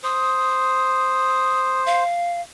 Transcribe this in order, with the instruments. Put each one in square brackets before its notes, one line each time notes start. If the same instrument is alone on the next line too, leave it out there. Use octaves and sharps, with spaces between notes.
[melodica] C5 [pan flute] D#6
[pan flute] F5